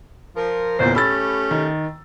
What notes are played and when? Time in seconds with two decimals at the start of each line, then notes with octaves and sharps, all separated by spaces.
0.36 F3 A#4
0.79 G1 E2 A#2 A#3 C5
0.95 A3 C#4 G4 B5 E6 A6
1.51 D#3